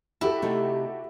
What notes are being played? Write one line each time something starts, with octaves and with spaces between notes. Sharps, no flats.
E4 F#4 G4 A4
C3 A3 D#4